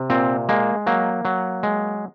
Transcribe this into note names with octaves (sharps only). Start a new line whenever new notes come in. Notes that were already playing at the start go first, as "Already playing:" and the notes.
Already playing: C3
A#2 C4
G#3 A#3
F#3 A#3
F#3
G#3